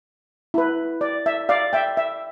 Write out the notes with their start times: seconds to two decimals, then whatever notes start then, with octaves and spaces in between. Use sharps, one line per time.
0.54 E4 B4
1.01 D5
1.26 E5
1.49 D5 F5
1.73 E5 G5
1.97 E5